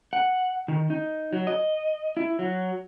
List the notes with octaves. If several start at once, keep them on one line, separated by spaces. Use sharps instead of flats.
F#5
D#3
D#4
F#3
D#5
E4
F#3